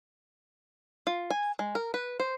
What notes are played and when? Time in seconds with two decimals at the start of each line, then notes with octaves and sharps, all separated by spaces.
1.07 F4
1.30 G#5
1.59 G#3
1.75 A#4
1.94 B4
2.20 C5